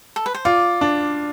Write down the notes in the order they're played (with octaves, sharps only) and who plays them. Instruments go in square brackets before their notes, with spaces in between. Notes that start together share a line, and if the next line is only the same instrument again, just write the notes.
[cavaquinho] A4
B4
C5
[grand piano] F4 [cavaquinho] D5
[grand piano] D4